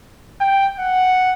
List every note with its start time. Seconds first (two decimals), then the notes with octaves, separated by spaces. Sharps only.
0.41 G5
0.80 F#5